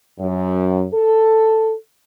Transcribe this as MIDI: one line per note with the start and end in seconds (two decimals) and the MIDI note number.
0.19 0.84 42
0.93 1.73 69